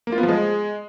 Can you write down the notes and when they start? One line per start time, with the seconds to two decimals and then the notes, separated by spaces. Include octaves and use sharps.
0.07 A#3
0.12 F4
0.18 B3
0.23 F3
0.28 G#3